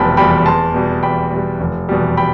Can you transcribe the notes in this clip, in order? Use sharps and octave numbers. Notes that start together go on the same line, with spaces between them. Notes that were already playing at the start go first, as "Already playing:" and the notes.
Already playing: F1 E2 B2 G3 G5 A5 B5
E2 B2 G3 G5 B5
E2 A5 C6
B2 G3
E2 G5 B5
B2 G3
F1
E2 B2 G3
G5 B5